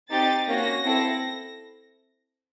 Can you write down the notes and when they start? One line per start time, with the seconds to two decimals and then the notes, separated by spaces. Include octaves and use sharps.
0.10 C4 D#4 G4 A6
0.48 A#3 C#4 F#4 A#6
0.84 C4 E4 A4